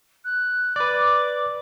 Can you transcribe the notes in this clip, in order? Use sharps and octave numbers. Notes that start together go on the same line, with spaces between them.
F#6
B4 D5 D6